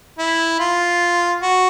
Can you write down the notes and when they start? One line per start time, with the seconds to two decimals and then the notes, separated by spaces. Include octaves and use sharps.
0.19 E4
0.60 F4
1.42 F#4